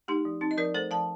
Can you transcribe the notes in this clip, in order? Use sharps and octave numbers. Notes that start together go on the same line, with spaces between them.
A3 D#4 G4
F3
C4 D#4
D#5
F3 A#4 D5
A3 A4 C5
F3 F5 A5